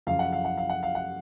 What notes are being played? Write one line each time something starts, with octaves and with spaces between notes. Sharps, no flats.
F#2 C#3 F3 F5
F#5
F5
F#5
F5
F#5
F5
F#5